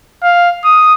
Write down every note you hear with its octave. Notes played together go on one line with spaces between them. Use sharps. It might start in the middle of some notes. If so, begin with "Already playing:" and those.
F5
D#6